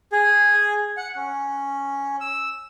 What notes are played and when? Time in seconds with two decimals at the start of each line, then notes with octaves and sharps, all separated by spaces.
0.12 G#4
0.97 F#5
1.16 C#4
2.21 E6